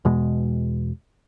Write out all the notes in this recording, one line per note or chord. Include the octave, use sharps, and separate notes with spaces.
E2 B2 G#3